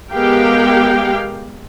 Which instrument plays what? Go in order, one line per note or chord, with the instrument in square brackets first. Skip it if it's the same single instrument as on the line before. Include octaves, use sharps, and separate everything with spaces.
[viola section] G#3 B3 G4 A#4 F5 G5